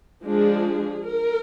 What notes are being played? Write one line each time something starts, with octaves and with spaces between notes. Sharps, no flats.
F3 G#3 D4 G#4
A#4